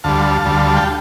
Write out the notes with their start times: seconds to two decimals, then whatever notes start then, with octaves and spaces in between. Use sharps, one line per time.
0.04 D2 D3 G3 F5 A5
0.46 D2 D3 G3
0.76 G5